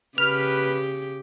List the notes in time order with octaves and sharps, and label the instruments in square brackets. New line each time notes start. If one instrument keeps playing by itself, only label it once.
[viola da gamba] C#3 G4 [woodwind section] B4 [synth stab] F6